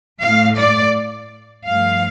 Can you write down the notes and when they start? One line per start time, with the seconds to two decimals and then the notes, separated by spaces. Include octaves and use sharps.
0.20 A2 A3 F5
0.57 D5
1.67 G2 F3 A3 F5